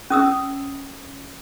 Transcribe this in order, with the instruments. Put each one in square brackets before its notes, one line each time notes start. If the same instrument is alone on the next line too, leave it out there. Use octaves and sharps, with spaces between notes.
[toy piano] C#4 D#6 E6